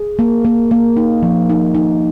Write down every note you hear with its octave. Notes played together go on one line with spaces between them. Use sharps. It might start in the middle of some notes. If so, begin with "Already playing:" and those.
Already playing: G#4
A#3
A#3
A#3
D#4
F3
D#4
D#4